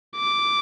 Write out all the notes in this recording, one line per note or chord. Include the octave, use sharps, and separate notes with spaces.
D6